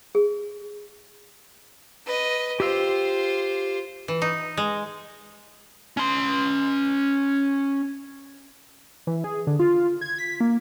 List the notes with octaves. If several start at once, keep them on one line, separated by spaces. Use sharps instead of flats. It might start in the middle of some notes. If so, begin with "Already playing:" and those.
G#4
B4 D#5
F4 G4 C5 E6
E3
D#4
G#3
C#4 C6
E3
G#4
D3
F4
G#6
B6
A#3